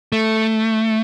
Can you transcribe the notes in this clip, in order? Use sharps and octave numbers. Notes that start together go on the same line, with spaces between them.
A3